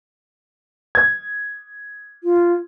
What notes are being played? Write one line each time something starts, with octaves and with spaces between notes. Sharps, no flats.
G#6
F4